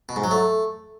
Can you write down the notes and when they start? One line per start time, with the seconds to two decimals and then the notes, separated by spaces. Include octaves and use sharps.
0.09 B2
0.16 G#2
0.24 F#3
0.31 A3